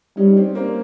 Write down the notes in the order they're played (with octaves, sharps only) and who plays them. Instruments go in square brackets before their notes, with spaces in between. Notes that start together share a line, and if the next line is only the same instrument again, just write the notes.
[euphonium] G3 [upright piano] C#4 D#4
[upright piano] C4 D4
A#3 C4